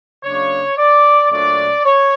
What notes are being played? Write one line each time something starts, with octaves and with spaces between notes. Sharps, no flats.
C#3 F#3 A#3 D4 C#5
D5
A#2 F#3 A3 D4 D5
C#5